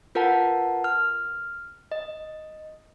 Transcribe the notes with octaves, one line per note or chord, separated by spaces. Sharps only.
F4 A#4 B4 F#5 A5
F6
D#5